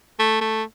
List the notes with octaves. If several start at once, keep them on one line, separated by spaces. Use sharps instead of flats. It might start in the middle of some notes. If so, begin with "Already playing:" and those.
A3
A3